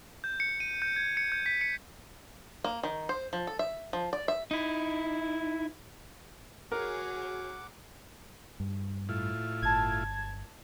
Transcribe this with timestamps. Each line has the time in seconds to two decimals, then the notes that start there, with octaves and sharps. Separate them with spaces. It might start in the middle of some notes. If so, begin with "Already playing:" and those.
0.24 G6
0.40 C#7
0.60 D#7
0.82 G6
0.96 G#6
1.17 C#7
1.32 G6
1.46 B6
1.61 C#7
2.64 A#3
2.83 D#3
3.09 C5
3.33 F3
3.47 A4
3.59 E5
3.93 F3
4.13 D5
4.28 E5
4.51 D#4 E4
6.72 F#4 G#4 A#4 C#5 F#5 D6
8.60 G2
9.09 A2 E4 F4
9.62 G1 A5 G#6